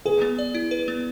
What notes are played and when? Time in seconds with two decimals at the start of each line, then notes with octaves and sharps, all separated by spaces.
0.05 G#4 B4
0.21 B3
0.38 D5
0.54 E4
0.71 B4
0.88 B3